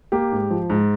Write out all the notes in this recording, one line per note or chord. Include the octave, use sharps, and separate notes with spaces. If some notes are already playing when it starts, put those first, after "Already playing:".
A#3 G4
G#2
F3
G#2